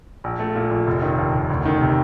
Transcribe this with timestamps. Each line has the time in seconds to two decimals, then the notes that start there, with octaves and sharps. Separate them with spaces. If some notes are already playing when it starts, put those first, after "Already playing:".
0.24 A#1
0.39 A3
0.56 A#2
0.71 A#1
0.87 F1
1.02 D#3
1.18 D#2
1.34 F1
1.50 D2
1.65 D#3
1.81 C3